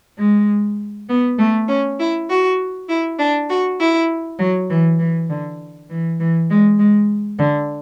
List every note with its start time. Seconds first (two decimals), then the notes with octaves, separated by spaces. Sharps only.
0.18 G#3
1.09 B3
1.38 A3
1.68 C#4
1.99 E4
2.29 F#4
2.89 E4
3.18 D4
3.49 F#4
3.79 E4
4.39 F#3
4.69 E3
4.99 E3
5.29 D3
5.89 E3
6.19 E3
6.50 G#3
6.79 G#3
7.39 D3